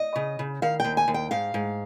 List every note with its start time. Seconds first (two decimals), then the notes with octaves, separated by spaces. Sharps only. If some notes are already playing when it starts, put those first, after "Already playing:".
Already playing: D#5
0.16 C#3
0.39 C#3
0.62 D#3 F5
0.80 D#2 G5
0.97 G#5
1.08 D#2
1.14 G5
1.31 G#2 F5
1.54 G#2